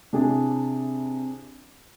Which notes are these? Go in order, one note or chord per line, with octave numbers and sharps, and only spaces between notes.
C3 D4 E4 G4 G#4